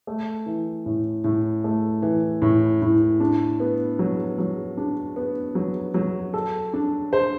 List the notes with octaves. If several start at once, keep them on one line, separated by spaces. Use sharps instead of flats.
A3
E3
A2
A2
A3
E3
A2
A2
D4
B3
F#3
F#3
D4
B3
F#3
F#3
A4
D4
C5